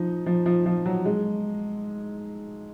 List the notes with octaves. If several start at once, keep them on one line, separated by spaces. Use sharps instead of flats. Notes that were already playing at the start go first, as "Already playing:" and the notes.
Already playing: F3 D#4
F3
F3
F3
F#3
G#3